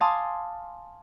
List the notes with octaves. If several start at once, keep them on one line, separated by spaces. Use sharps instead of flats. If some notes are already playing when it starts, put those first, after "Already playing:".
F5 G#5 A5 C6 D6 D#6